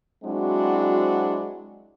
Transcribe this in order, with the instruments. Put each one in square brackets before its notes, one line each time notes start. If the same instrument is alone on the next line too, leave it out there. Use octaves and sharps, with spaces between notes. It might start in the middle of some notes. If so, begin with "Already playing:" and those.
[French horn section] F#3 G#3 C4 D4 E4 F#4